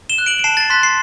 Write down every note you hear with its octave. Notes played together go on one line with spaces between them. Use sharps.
E7 G7
F#6
D7 F#7
D7
A5 C7 E7
A6
C6 F#6 B6
C7